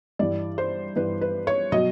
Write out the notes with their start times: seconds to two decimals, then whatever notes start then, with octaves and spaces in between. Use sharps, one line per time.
0.19 G2 E3 G3 D5
0.58 C5
0.96 G2 E3 G3 B4
1.21 B4
1.47 C#5
1.72 B2 F#3 D#5